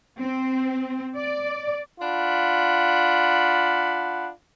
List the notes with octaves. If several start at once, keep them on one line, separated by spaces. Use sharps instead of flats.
C4
D5
D4 F4 F#5 B5